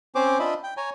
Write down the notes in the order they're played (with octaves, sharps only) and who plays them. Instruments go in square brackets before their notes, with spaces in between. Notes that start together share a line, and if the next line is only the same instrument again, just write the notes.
[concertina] C4 C#4 C5 D6
D4 F4 D#5 E5 B5
G5
C#5 G#5 A#5